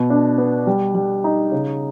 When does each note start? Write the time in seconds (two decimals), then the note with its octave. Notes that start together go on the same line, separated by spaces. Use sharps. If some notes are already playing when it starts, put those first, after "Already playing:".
Already playing: B2
0.10 D4
0.38 B3
0.67 G3
0.95 G3
1.24 D#4
1.52 C#3